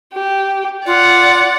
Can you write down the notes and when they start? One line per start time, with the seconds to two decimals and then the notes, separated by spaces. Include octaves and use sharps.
0.13 G4
0.86 F4 D5 F#5